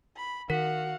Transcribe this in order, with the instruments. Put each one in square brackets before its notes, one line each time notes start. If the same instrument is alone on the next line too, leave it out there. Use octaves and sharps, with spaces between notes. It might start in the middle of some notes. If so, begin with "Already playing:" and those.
[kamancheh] B5
[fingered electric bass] D#3 [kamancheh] F#4 [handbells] A#4 B6 [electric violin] F5 F#5